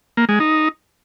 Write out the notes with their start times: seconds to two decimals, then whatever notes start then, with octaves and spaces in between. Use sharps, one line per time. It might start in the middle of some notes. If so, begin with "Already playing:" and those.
0.17 A#3
0.29 G#3
0.40 D#4